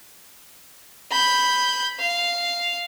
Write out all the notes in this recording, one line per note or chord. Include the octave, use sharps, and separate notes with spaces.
B5 G6
F5